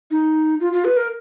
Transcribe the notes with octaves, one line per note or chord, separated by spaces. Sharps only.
D#4
F4
F4
B4
A#4